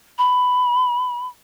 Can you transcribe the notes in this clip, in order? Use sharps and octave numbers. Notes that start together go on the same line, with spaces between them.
B5